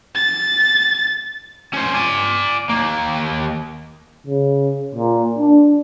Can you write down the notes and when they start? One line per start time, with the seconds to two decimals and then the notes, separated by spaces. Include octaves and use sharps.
0.15 A6
1.74 C#4 C5
1.94 D5 G#5
2.69 D#2 A#3
4.27 C#3
4.95 A#2
5.38 D4